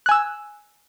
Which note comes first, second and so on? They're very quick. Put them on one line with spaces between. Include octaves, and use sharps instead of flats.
F#6 G#5 E6